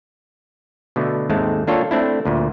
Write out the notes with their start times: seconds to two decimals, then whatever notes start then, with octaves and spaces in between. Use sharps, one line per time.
0.96 B2 D3 A3
1.29 D#2 G#2 G#3 A3 C4 A5
1.67 A#3 D4 F4 A4 C#5 G5
1.91 A3 C4 D4 E4
2.25 D2 A#2